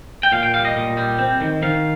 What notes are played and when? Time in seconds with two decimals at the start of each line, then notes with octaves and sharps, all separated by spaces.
0.23 G5
0.32 A#2 F5
0.43 G5
0.54 G3 F5
0.65 D#5
0.76 A#2
0.97 G3
1.19 C4
1.41 D#3
1.62 D#3 F5